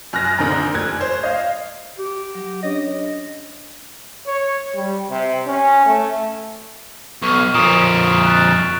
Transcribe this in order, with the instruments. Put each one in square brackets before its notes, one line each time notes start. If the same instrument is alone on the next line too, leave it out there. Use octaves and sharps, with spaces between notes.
[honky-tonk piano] F#2 F6 F#6 A#6
A#1 D3 D#3 C4 A#5
F1 F#6 G#6
C5 C#5
D#5 F5
[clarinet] G4
[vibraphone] F#3
[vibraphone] C#4 D4 C#5 [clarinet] D#5
[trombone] C#5
G3
C3
C#4
A3
[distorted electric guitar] B1 [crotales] C#6 F6
[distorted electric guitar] F2 A#2 [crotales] D#6 D7 E7
[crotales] F#6 A6